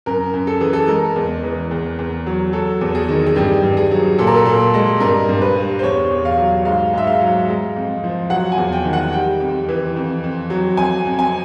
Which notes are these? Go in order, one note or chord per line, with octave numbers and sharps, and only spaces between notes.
F#2 A#4
F#2
A4
E3 G#4
A4
G#3 A#4
E2
E3
E2
E2
F#3
F#3 A4
E2
G#4
D#3
G#4
G2 G4
G2
G#4
F#3
A#2 A4
A#4
A4
A#2
G#3
G2 A#4
G2
B4
G3
C5
E2 C#5
E2
F5
F#3
G#2 F5
G#2 E5
F5
F#3
G#3
F2
F3
F#3 F#5
G#5
E2
G5
D#3
F#5
G3 G5
F2
E3
F2
F2
F#3
F2 G#5
F2
G#5